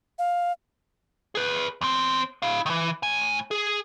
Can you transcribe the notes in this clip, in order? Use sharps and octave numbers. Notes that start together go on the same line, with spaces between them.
F5
G#4 B4
E2 C4
E4 F5
D#3 E3
A2 G#5
G#4